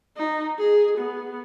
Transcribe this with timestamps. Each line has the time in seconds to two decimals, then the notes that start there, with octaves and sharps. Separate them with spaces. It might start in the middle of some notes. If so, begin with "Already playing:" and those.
0.17 D#4
0.59 G#4
0.98 B3